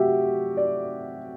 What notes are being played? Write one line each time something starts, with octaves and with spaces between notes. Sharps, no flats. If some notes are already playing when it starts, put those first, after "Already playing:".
Already playing: C3 F#3 A3 F#4 G4 E5
D5